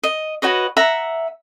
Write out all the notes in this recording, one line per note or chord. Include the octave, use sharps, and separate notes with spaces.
D#5
F#4 B4 C#5 D#5
E5 F#5 A#5